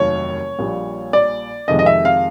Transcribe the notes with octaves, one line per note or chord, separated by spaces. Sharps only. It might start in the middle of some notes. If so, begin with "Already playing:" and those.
Already playing: F1 D#2 D#3 F#3 C#5
A#1 A#2 G3
D5
F2 C3 D#3 G#3 D#5
D#5
E5
F5